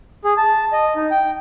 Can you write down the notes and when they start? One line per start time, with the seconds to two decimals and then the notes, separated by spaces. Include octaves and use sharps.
0.24 G#4
0.37 A5
0.72 D#5
0.96 D#4
1.11 G5